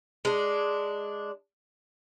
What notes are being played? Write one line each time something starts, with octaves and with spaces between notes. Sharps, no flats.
G#3 D4